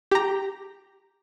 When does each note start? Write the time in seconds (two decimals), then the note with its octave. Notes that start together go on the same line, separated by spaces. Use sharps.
0.11 G4 A#5